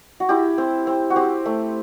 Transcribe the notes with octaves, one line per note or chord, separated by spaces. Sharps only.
F#4
E4 G4
C4
C4
F#4
C4 G4
A3